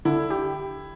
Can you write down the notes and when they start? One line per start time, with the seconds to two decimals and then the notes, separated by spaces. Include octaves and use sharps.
0.05 D3 E4
0.30 G4